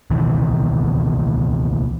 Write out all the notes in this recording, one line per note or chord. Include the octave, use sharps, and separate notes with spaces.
C#2 B2 D#3 E3